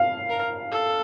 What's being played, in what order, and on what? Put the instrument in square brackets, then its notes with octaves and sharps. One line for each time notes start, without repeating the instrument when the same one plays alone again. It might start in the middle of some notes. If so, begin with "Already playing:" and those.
Already playing: [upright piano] F5
[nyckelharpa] A#4
A4